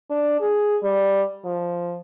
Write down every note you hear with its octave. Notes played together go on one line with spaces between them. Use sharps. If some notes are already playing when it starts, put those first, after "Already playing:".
D4
G#4
G3
F3